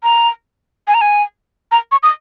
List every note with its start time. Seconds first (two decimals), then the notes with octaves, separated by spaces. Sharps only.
0.03 A#5
0.88 G#5
0.94 A#5
1.01 G#5
1.72 A#5
1.92 C#6
2.03 D#6